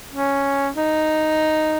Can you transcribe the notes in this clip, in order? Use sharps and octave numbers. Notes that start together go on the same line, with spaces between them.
C#4
D#4